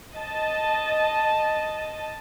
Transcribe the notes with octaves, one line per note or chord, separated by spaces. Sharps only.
D#5 A5